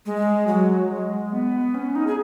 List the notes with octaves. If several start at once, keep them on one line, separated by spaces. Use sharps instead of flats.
G#3
F#3
G#3
B3
C#4
D#4
G#4